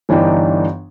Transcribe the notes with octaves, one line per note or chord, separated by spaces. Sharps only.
G1 E3 D4 D#4 G5